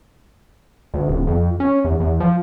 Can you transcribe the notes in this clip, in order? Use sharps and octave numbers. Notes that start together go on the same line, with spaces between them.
D2
D#1
F2
C#4
E2
E2
F3